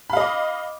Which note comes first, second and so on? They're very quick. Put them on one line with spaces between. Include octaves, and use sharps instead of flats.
B5 F5 D#5 D6